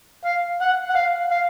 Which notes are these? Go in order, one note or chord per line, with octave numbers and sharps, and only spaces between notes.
F5
F#5
F#5
F5
F5